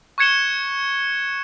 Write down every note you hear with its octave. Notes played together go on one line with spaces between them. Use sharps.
C#6 F#6 G#6 C#7 E7 G7